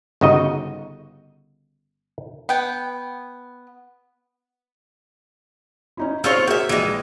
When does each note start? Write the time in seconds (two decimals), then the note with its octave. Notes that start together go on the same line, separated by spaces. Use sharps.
0.21 G1 C#3 D#4 F#4 D#5
2.49 B3 G5
5.97 C#4 D#4 E4
6.24 C4 F4 G#4 C#5 F6
6.47 A#3 F#4 G#4 E5 G5
6.69 A#1 E3 G#3